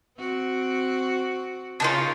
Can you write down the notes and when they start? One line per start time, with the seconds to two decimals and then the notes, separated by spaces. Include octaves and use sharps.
0.18 C4 F#4
1.80 C#3 D4 D#4 F4 A#4 C#5